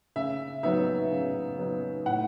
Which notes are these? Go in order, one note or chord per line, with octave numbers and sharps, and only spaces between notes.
C#3 E5
F#3 B3 D#4 E5
C#3
F#3 B3 D#4
A2 F#5